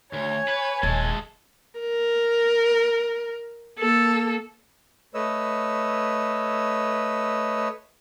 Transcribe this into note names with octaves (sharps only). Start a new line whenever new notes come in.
D2 C#5 G#5 G#6
B4
D#1 G#3 A4
A#4
A#3 A4
A3 B4 C#5 D#5 E6